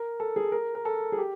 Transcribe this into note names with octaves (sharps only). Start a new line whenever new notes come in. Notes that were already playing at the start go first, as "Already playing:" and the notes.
Already playing: A#4
A4
G#4
A#4
A#4
A4
G#4
G4